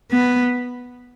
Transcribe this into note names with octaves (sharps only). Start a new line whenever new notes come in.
B3